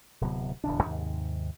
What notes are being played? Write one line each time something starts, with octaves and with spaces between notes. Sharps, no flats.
D1 C3 F#3 B3
D1 E2 C#3 D4
D#2 G#2 C3